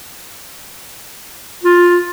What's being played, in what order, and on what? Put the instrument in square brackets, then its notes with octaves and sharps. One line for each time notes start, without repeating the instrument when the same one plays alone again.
[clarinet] F4